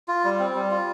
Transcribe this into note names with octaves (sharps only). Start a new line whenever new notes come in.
F4
G3
C4
G3
F4